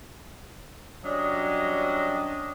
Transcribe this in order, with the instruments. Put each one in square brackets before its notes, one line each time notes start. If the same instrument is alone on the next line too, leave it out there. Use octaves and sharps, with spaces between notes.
[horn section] F#3 G3 C#4 D4 D#5